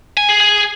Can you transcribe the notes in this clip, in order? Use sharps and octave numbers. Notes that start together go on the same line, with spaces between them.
G#5
G#4
G#4